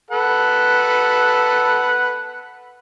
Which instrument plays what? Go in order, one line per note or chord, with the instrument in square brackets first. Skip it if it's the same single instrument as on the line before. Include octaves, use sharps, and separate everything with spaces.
[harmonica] A4 B4 F#5